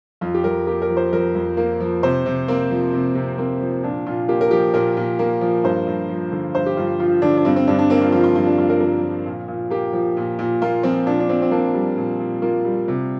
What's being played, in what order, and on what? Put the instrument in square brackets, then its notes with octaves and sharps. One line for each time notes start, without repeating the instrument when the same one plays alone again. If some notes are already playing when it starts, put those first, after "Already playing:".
[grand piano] F2 F4
G4
F2 A#4
A#3 G4
A#4
F3
C5
F2 A#4
F2
A#3
F3
C3 C5
C3
A#3 C4
F3
C3
C3
A#3 C4
F3
A#2 D4
A#2 F4
A#3 G4
A#4
F3 G4
A#2 A#4
A#2
A#3
F3
G2 C5
G2
F3
D3
G2 C5
G4
G2 F4
F3 F4
D3 D4
D4
G2 C4
C4
G2 D4
D4
A#3 C4
F4
F3 F4
F4
G2 F4
D4
G2 F4
A#4
A#3 A#4
F3
A#2
A#2
A#3 G4
F3
A#2
A#2
A#3 F4
F3 C4
A#2 D4
D4
A#2 C4
C4
A#3 D4
G3
A#2
A#2
A#3 F4
G3
C3